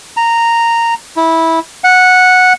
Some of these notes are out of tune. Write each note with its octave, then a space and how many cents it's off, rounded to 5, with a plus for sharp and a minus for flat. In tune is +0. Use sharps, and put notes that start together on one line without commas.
A#5 -10
E4 -15
F#5 -10